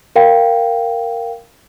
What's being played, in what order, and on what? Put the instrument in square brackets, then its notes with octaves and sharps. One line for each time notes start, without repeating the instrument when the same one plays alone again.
[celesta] A#4 F5 G5